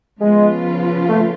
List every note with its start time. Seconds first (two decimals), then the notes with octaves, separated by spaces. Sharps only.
0.20 C#3 F3 G#3 B3 F4 B4
1.09 A3